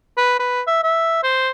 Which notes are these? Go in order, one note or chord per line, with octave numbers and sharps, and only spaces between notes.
B4
B4
E5
E5
C5